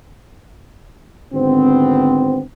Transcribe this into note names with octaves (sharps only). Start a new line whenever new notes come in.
G#1 D3 B3 C4